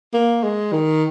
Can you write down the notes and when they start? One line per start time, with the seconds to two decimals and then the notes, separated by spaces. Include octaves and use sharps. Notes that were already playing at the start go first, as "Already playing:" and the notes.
0.14 A#3
0.44 G#3
0.73 D#3